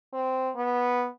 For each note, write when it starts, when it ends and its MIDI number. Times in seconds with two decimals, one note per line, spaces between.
0.13 0.51 60
0.55 1.07 59